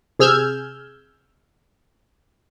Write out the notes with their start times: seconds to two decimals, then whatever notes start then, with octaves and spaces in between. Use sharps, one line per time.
0.19 C3 G#4 E6 F6 G6 G#6